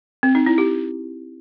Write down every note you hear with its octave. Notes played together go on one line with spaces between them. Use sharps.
C4
D#4
E4
G4